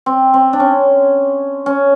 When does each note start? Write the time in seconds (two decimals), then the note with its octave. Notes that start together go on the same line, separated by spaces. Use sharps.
0.06 C4
0.34 C4
0.53 D4
0.60 C#4
1.66 C#4